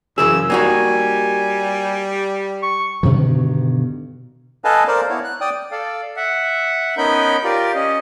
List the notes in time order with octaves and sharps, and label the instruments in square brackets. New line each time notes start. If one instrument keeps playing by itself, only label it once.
[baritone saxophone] F#2 [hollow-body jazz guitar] C#3 E3 G#4 [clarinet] E6
[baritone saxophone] G3 [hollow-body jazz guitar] A#3 D#4 F#4 [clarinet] G#5
[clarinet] C#6
[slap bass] G2 B2 D3 D#3
[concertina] A4 B4 D#5 F5 G#5 A5
A#4 C5 D5 F5
B3 E4 C#5
F#6
D5 G5 D#6
[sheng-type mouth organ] A4 D5 F5
E5 F#5
B3 C#4 D#4 A#4 B5 G6
F4 G4 A#4 D5
C#4 D#5